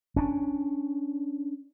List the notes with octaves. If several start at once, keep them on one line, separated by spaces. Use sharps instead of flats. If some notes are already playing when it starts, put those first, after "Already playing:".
C#4 D4